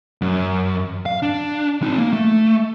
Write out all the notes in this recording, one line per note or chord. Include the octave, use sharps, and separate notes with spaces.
F#2
F5
D4
C4 D#4
A#3
A3